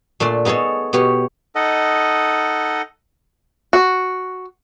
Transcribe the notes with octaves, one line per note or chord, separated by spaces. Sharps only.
A#2 A3 D4 D5 C6
B3 D#4 G#4 A4 C#5
B2 B3 G4 C#5
D#4 A4 D#5 F#5
F#4